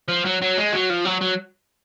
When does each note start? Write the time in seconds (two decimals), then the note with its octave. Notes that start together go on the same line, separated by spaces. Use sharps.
0.08 F3
0.25 F#3
0.41 F#3
0.58 G#3
0.73 F#3
0.90 F3
1.05 F#3
1.21 F#3